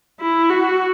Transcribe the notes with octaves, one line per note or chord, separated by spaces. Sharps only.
E4
F#4